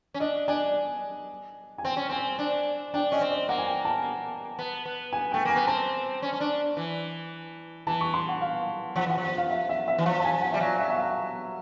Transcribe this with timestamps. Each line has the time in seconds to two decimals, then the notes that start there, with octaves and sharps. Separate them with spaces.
0.14 C#4
0.20 D4 D#5
0.48 D4 G#5
1.78 G#5
1.84 C4 G5
1.97 C#4
2.09 C4 G#5
2.39 D4
2.94 D4 G5
3.12 C#4 D#5
3.21 C4
3.31 D5
3.49 A#3 F#5
3.58 G#5
3.67 G5
3.85 A5
4.59 B3
4.86 B3
5.13 G#5
5.32 A3 G5
5.45 A#3 G#5
5.56 B3
5.67 C4 A5
6.22 C#4
6.33 C#4
6.40 D4
6.77 E3
7.87 E3 A5
8.01 C#6
8.14 C6
8.28 F#5
8.41 F5
8.96 F3 F#5
9.07 E3 F#5
9.18 F3
9.23 F#5
9.38 F5
9.50 E5
9.69 E5
9.88 E5
9.98 E3
10.05 F3 F5
10.20 A5
10.25 G#5
10.42 F#5
10.52 G3 E5
10.60 F#3 F5
10.79 E5
10.90 E5
10.96 F5